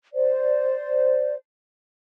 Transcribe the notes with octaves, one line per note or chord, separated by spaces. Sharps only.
C5 D5